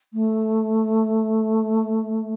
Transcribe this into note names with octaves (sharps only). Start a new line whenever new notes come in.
A3